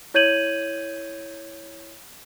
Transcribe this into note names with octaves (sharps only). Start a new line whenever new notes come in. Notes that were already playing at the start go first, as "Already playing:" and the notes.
E4 C#5 G6 G#6 D#7 F#7